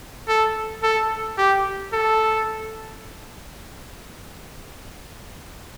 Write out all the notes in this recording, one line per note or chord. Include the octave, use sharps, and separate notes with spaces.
A4
A4
G4
A4